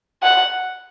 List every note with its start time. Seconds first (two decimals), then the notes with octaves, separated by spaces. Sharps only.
0.23 F#5